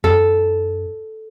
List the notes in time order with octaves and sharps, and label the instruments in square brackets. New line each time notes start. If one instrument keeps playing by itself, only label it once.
[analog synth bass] F#2 [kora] A4